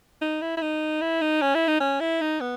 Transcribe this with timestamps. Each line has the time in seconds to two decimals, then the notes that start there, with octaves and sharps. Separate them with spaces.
0.22 D#4
0.42 E4
0.57 E4
0.61 D#4
1.01 E4
1.21 D#4
1.42 C#4
1.55 E4
1.68 D#4
1.80 C#4
2.00 E4
2.21 D#4
2.40 B3